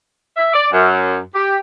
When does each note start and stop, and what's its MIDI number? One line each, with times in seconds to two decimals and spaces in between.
0.37 0.50 76
0.54 0.67 74
0.73 1.19 42
1.35 1.57 67